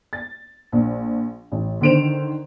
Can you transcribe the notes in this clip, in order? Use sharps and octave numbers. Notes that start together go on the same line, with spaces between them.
A6
A#1
A1
D3 D#3 C5 D7 E7 F7